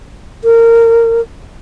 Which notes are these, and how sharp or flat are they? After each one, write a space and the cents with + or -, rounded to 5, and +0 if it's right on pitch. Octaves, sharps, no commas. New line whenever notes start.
A#4 -20